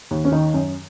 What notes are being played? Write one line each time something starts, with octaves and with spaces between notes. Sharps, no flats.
D#2
C#4
D#3 D#4
F#2